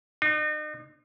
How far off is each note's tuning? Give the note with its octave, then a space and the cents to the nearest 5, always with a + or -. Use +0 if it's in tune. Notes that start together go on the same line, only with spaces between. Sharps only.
D#4 -40